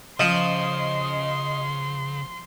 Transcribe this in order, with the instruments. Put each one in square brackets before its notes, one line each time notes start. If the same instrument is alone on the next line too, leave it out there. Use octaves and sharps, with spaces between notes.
[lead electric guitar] C#3 [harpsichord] F3 [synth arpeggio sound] D#5 [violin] C6